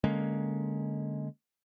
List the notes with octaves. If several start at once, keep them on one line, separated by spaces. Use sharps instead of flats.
D3 G#3 A#3 C#4